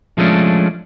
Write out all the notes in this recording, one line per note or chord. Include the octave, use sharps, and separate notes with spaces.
F3 G#3 A3 C#4 D4